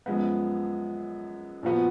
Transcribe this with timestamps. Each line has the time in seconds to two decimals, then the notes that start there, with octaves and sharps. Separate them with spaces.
0.06 F#2 F3 G#3 B3
1.63 A#2 F3 B3 F#4